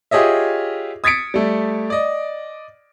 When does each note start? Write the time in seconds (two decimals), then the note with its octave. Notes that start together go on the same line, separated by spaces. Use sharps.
0.11 F4 G4 G#4 C#5 D#5 E5
1.04 D#6 G#6 A6 B6 C#7 D7
1.34 G3 A3
1.90 D5 D#5